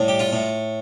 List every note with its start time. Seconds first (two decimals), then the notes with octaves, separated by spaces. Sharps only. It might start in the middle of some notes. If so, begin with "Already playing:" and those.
Already playing: A2 G3
0.08 G4
0.19 F4
0.33 A2